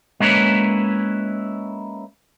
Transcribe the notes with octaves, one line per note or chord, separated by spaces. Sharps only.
G#3 A#3 C#4 E4 B4 C#5